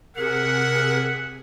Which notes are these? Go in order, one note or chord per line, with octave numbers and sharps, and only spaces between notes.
C3 G#4 A#4 E5 F#5